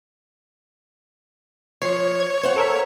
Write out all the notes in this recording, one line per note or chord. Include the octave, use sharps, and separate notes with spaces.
F3 C#5 C7
G#6
C5 F5 F#5
A4 A#4 E5